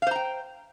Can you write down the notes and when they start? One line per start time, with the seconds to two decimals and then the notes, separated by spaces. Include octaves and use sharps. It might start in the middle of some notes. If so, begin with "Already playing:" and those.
0.02 F5
0.07 C5
0.11 A#5
0.16 G5